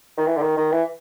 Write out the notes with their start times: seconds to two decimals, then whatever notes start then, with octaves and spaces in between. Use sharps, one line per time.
0.17 D#3
0.27 E3
0.37 D3
0.42 D#3
0.57 D#3
0.72 E3